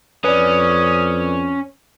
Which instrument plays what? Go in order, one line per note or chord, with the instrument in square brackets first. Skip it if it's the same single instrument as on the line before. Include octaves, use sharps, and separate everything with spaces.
[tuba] F2 [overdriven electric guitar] C#4 [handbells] B4 D5 [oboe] D#6